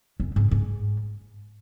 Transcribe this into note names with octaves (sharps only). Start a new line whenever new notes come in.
F#2
G#2
G#2